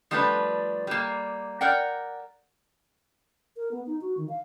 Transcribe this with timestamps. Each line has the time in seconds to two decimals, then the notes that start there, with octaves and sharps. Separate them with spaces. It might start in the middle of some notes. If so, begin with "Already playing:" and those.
0.11 F3 G3 A3 D4 G#4 B4
0.87 G3 A#3
1.61 A#4 D5 F#5 G5
3.57 A#4
3.71 B3
3.86 D#4
4.01 F#4
4.17 D#3
4.29 F5